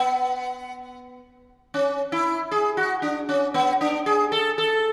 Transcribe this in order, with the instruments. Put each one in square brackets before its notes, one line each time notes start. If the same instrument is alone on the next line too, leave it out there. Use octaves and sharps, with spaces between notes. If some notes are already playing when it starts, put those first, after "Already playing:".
Already playing: [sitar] B3
C#4
E4
G#4
F#4
D4
C#4
B3
D4
G#4
A4
A4